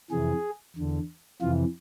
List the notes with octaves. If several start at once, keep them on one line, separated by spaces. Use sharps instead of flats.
F2 C3 E3 G#4
E2 D3
F2 C3 E3 F4